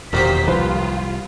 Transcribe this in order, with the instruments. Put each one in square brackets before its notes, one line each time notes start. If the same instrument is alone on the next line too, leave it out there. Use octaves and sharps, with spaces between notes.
[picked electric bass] E1 [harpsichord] D#2 F#3 G4 [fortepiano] A#2 [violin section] C5 B6
[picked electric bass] C2 [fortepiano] F3 B4 C5 [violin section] F4